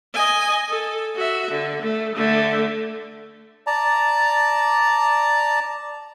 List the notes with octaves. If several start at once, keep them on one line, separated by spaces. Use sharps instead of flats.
D#5 G#5
A4
F#4 E5
D3
A3
D3 A3
D5 A5 A#5